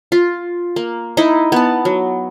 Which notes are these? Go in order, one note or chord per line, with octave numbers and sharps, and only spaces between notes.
F4
A#3
D#4 E4 D#5
B3 A5
F#3